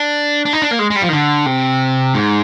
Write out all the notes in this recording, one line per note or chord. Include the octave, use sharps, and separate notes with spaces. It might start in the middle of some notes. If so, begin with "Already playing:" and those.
Already playing: D4
D4
D#4
D4
A#3
G#3
G#3
G3
F3
D#3
D3
C3
G#2